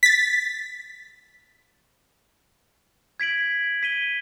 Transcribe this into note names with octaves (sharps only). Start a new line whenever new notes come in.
A6 B6
G#6 B6 D7 F#7
B6 D#7 G7